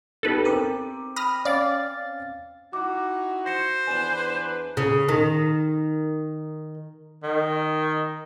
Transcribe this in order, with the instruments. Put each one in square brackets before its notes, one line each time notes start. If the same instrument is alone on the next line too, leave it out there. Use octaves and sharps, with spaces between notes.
[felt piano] B3 D#4 G4 [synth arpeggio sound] A4 B4
[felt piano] C4 D6 D#7 [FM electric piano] A#4
[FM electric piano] B5 [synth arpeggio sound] D#6 F6 A#6
[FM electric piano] C#4 F5 A6 [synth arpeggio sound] D5
[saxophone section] D#4 E4 F#4 [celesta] D6
[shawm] C5 [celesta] A#6 C#7 E7
[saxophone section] E2 D4 B4 [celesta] G#5 E7
[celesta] E7
[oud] C#3
D#3
[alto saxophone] D#3